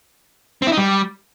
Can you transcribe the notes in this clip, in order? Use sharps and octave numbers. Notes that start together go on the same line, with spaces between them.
C4
E4
D#4
G3